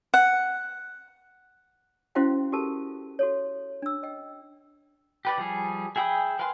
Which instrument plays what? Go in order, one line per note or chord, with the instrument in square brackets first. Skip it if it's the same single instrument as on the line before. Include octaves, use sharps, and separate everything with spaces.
[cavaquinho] F#5
[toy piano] C#4 E4 F#4 C5 F5 G5
F#4 G4 A4 A#4 A5
F#4 A4 C#5
D4 E6
D#5 G5
[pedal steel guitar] G4 B4 D5
F3 G3 G#4
G#4 E5 G5 B5 D#6
A#4 B4 F5 G#5 C6